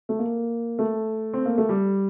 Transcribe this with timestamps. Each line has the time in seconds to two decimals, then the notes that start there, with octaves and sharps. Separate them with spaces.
0.09 A3
0.19 A#3
0.79 A3
1.34 C4
1.46 A#3
1.58 A3
1.69 G3